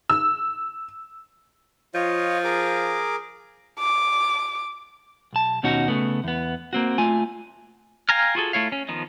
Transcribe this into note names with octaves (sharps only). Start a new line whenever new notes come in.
E6
F3 F4 C#5 D#5
G#4 A#4 D6
D6
B1 A5
D#2 B2 C#4 D#4 F#4
C#3 A3 B3
E2 B3
A#3 C4 F#4
A3 F4 G#5
F5 G5 G#5 A#5 F6
F4 F#4 G#4 A4
A3 E4 C#5 F5
C#4
D#3 F3 B3 D#4